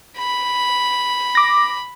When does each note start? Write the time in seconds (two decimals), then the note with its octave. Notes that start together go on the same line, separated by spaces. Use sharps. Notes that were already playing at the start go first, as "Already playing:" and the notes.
0.18 B5
1.35 D6 A#6